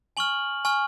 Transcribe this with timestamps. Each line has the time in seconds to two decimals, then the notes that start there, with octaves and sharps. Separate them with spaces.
0.17 G#5 C#6 F6 F#7
0.65 G#5 C#6 F6